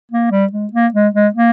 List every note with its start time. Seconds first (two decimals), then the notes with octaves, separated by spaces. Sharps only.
0.12 A#3
0.31 G3
0.52 G#3
0.73 A#3
0.94 G#3
1.14 G#3
1.34 A#3